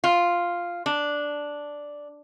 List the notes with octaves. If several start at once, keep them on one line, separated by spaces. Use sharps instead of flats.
F4
D4